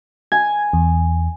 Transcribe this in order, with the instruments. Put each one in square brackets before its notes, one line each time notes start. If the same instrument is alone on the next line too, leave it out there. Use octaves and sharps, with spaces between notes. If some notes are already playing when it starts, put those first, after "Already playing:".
[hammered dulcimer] G#5 [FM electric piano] G#6
[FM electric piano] E2